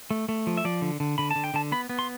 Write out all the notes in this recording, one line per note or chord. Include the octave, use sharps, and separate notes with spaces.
A3
A3
F3
E5
F3 D5
D3
D3
D3 B5
D3 A5
G5
D3 A5
B3 B5
B3
C6